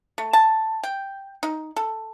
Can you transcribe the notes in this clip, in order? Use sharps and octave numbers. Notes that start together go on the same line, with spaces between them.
A3
A5
G5
D#4
A4